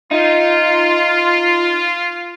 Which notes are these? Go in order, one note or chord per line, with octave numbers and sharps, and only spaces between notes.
D#4 F4